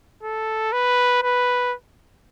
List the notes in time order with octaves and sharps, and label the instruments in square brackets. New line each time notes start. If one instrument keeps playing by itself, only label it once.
[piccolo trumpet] A4
B4
B4